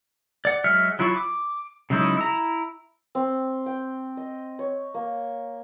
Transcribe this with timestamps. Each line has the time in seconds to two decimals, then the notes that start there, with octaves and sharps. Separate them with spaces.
0.45 D5 F#5
0.64 F#3 G#3 E5 F#5 F6
0.99 F#3 E4 F4 B5 C#6
1.16 D6
1.90 C#3 F#3 G#3 D#4 E4
2.17 E4 A#5
3.15 C4
3.66 G5
4.17 D#5
4.59 C#5
4.94 A#3